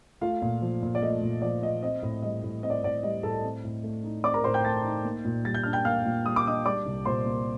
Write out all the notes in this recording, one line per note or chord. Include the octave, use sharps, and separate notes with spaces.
A3 F4 F5
A#2
F3
A#2
D5
A3 D#5
A#2
F3 D5
A#2 D#5
C4 D#5
A2
G3 D#5
A2
C4 D#5
D5
A2 D5
G3 D#5
A2 A4 A5
C4
A2
A3
D#4
C4 D5 D6
A#4 A#5
A2 C5 C6
G5 G6
A3 A5 A6
D#4
A#3
A#2
G3 A6
G6
D4 F6
G5 G6
A#3 F5 F6
A#2
G3 D#6
D6
D4 D#5 D#6
G3 D5 D6
C2
A#2 C5 C6
A#3